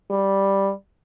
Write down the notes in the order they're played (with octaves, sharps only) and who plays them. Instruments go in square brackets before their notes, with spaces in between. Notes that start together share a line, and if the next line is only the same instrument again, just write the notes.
[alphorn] G3